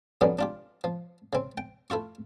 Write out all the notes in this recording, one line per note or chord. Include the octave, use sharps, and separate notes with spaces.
F2 D3 F#3 G3 B3 C#4
D4 F4 G4
F3
C#3 C4
G5
A3 E4 F4 C#6